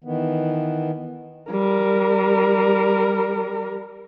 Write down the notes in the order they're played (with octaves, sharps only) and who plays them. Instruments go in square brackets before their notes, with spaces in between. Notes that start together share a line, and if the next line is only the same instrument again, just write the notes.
[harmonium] D#3 E3 B3
[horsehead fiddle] G3 A#4